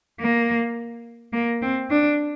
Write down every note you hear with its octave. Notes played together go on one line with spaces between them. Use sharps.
A#3
A#3
C4
D4